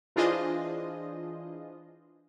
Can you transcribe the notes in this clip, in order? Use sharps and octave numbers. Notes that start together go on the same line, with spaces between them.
E3 D4 F4 G#4 C5 D#5